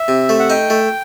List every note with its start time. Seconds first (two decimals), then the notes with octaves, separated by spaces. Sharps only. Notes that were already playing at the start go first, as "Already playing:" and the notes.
Already playing: E5
0.08 C3
0.29 A3
0.39 F#5
0.50 D#4 G5
0.70 A3